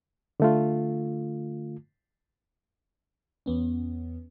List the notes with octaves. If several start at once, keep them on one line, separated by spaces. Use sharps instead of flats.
D3 A3 F4
E2 B3 C#4